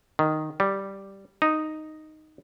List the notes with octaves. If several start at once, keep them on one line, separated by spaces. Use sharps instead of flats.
D#3
G3
D#4